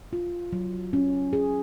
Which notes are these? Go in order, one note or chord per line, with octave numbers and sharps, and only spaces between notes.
F4
F#3
C#4
G#4